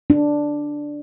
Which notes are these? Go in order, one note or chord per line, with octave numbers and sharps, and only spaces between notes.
D4